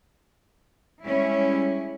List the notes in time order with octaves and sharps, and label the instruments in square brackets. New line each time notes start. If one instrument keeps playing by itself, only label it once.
[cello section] G3 G#3 C#4 E4